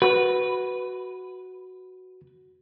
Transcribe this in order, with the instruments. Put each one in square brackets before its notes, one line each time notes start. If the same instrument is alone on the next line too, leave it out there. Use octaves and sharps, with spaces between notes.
[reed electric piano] F#4 [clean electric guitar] B4